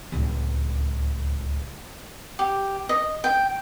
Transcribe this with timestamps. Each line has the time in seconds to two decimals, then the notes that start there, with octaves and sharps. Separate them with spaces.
0.12 D1 C#2
2.39 G4
2.89 D#5
3.24 G5